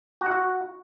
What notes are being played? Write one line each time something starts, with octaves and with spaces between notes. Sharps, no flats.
F#4
F#5
F#4